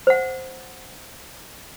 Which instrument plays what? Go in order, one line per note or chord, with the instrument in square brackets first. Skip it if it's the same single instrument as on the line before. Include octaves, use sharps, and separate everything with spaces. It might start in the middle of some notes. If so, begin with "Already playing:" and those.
[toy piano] C5 F#5